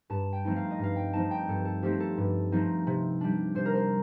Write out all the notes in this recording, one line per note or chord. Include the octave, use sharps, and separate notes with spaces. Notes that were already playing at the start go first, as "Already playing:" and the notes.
G2 A5
G5
F3 A3 C4 D#4
F5
D#5
G2 F5
G5
F3 A3 C4 D#4 A5
G5
G2 A4
A4
F3 A3 C4 D#4 G4
A4
G2
F3 A3 C4 D#4
C3
G3 D4
C3 C5
A#4
C5